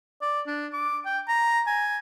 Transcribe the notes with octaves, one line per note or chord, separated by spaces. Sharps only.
D5
D4
D6
G5
A#5
G#5